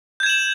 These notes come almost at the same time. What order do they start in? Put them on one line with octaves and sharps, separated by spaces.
G6 G#6 E7 F#7